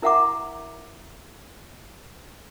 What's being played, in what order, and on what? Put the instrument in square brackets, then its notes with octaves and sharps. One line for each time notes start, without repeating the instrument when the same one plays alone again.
[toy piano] E4 A#4 E5 F#5 A#5 D6